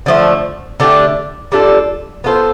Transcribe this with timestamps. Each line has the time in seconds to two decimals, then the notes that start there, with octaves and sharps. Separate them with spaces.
0.06 D3 F3 A3
0.80 D3 A3 D4 G4
1.52 G3 D4 F4 A4
2.24 B3 F4 A4 C5